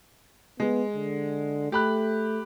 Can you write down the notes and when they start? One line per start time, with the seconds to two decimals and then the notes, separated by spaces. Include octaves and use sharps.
0.60 G#3 B3
0.95 D3
1.72 A3 G4 B5 F#6